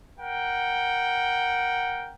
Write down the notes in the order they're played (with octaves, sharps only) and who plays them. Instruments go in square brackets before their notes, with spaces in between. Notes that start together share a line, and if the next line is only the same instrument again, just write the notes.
[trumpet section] A#4 F#5 G5